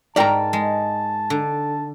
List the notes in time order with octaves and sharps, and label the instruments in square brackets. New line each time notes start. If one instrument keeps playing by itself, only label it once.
[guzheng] G#2 A#4 [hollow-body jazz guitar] D5 G5 A#5 [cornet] A5
[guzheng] G#3
D3